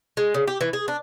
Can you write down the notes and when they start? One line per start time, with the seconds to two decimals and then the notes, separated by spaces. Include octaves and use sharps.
0.17 G#3
0.34 C#3
0.48 G4
0.61 E3
0.73 G#4
0.88 D4